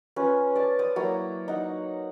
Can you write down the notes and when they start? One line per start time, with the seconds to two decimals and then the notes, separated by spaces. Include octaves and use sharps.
0.16 C#4 F4 B4
0.55 D5 A5
0.79 C5 D5 D#6
0.96 F#3 A#3 E4 A#5
1.48 D#4 F#5